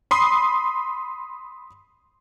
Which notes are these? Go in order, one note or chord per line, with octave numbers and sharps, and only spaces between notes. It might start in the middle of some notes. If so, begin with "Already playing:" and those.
B5 C6 D#6